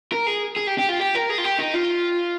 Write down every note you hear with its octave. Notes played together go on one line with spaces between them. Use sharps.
A#4
G#4
G#4
G4
G4
F4
G4
A#4
G#4
F4
G4
D#4
F4